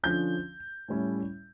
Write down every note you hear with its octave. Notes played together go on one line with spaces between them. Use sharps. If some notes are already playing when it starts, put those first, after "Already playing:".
D3 F3 C#4 G6
A2 G3 C#4 E4